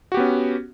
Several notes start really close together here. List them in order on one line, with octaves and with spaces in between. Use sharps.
F#4 G4 B3 C#4